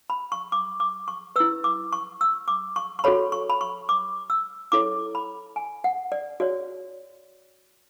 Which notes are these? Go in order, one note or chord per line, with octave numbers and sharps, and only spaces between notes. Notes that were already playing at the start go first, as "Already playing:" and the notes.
B5
C#6
D6
D6
C#6
E4 B4 E6
D6
C#6
E6
D6
C#6
C#6
F#4 A4 C#5 B5
C#6
B5
C#6
D6
E6
E4 A4 C#5 D6
B5
G#5
F#5
D5
F#4 C#5 D5